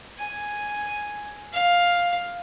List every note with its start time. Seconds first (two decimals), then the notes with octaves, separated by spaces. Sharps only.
0.18 G#5
1.53 F5